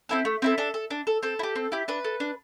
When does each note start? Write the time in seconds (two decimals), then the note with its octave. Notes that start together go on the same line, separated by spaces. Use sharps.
0.09 C4 E4 A4
0.25 A3
0.42 C4 E4 A4
0.58 D4 A4
0.74 A4
0.91 D4
1.07 A4
1.23 C4 A4
1.39 E4
1.43 G4
1.56 C4
1.72 E4 G4
1.88 D4 B4
2.04 A4
2.20 D4